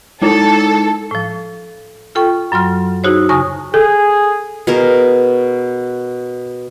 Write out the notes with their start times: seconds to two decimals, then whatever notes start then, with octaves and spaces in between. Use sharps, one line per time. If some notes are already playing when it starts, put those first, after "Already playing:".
0.22 G#3 D#4 E4 A4
1.11 A2 F3
2.15 F4 A4 G5 C#6
2.52 F#2 F#3 C6 F6
3.04 D#4 E4 F#4 G#4 C5 C#5
3.29 F2 C#3 G#5 C#6 D#6 A#6
3.74 G#4 A4
4.67 B2 G#4 A#4